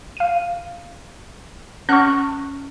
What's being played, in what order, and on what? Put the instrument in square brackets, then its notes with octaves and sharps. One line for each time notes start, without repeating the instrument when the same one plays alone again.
[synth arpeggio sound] F5 D#7
[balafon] C#4 F#5 [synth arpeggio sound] C#6 F6 F#6